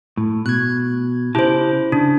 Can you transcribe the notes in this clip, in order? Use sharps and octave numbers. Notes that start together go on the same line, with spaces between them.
A2
B2 F#6 G#6
C#3 E4 G4 C5 A5
C#3 D4